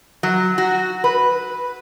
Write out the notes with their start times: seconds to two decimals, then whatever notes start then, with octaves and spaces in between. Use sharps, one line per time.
0.23 F#3
0.58 F#4
1.04 B4